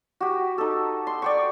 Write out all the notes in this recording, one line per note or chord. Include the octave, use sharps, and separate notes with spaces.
F#4 G4
D#4 A4
C6
D5 G5 C#6